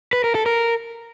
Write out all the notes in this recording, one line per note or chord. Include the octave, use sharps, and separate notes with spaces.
B4
A#4
A4
A#4